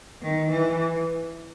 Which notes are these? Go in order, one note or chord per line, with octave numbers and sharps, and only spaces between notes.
D#3
E3